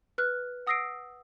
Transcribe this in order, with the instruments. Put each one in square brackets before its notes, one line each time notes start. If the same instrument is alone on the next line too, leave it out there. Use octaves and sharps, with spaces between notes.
[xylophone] B4 F6 F#6
F#5 D#6 E6 A#6 C7 D7